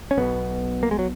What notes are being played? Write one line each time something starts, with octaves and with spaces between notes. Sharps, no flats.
C#4
B1 B2 B3
A#3
G#3
F#3